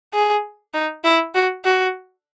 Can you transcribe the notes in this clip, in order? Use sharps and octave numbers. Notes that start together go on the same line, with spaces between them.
G#4
D#4
E4
F#4
F#4